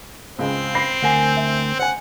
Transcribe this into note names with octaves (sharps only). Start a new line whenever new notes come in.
C#2 G#3 C4
B5 A#6 C7
D2 A#4 F#5 G#5
E5
C5 F#5 G#5